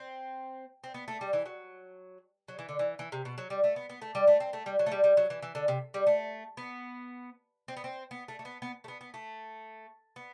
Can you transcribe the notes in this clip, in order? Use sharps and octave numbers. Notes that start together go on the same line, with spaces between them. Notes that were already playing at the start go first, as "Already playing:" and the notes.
Already playing: C4
C4
B3
A3
G3
E3
F#3
F#3
E3
D3
E3
E3
C3
B2
F#3
G3
A3
B3
B3
A3
G3
A3
C4
A3
G3
F#3
A3
G3
G3
F#3
E3
E3
D3
C3
G3
A3
B3
C4
B3
C4
B3
A3
A3
B3
B3
A3
B3
B3
A3
B3